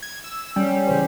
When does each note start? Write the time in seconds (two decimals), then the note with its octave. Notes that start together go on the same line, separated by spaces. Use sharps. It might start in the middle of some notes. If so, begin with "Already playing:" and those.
0.02 G#6
0.24 E6
0.56 G3 C#4
0.87 C#3 E3 C5